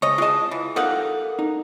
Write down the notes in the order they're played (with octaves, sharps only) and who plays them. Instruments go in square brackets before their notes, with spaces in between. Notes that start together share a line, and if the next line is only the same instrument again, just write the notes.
[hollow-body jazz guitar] C#2 [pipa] C#5 D#5
[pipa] G#3 D#5 [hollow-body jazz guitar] F4 G#4 A5
[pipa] E3
[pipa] G3 D#4 F#5 [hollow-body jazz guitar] A4 A#4 F5
[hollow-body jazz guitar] D#4